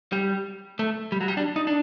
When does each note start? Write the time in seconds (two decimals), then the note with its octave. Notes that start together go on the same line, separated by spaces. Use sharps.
0.12 G3
0.79 A3
1.12 G3
1.21 F#3
1.28 G3
1.37 D4
1.56 D#4
1.67 D4